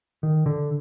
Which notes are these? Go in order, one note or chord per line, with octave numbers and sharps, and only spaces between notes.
D#3
D3